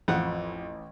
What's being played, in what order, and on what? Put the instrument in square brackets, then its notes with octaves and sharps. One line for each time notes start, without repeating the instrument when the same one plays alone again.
[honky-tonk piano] A1 [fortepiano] F2 F#5